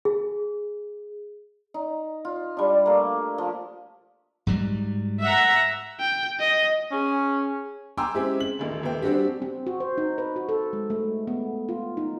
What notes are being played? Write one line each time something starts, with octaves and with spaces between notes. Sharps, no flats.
G#4
D#4
F4
G3 D4
A3 A#3
F3
G#2 F#3 G3
E5 F#5 A#5
G5
D#5
C#4 G#4
G5 G#5 A#5 C6 D6 E6
G#3 C4 C#4 E4 G4 G#4
F#7
D#1 A1
D#1 E3 G5
G3 C4 D4 F#4 G4
C4
F#4
C5
D#4
B4
F#4
A4
G#3
A3
B3
F4
D#4